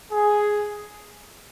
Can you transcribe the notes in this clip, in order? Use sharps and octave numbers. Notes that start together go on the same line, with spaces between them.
G#4